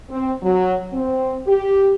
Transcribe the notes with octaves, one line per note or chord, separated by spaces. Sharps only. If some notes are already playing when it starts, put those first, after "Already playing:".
C4
F#3
C4
G4